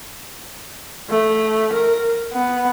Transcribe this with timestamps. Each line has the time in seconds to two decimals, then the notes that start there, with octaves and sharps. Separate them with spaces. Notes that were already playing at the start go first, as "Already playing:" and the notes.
1.10 A3
1.73 A#4
2.32 B3